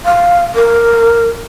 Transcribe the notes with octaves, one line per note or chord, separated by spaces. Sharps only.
F5
A#4